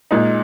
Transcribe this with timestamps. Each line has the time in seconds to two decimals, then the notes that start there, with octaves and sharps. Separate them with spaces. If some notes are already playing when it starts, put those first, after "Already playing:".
0.11 A#2 G#3 D#4